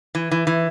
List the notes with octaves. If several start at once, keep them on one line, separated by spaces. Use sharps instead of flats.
E3
E3
E3